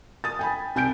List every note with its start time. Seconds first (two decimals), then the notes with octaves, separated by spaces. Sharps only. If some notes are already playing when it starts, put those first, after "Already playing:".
0.24 D#6 A6
0.39 G5 G#5 B5
0.75 C2 G#5 G6 D7